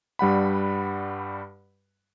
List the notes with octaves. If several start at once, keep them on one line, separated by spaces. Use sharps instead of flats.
G2 G3 F#5 B5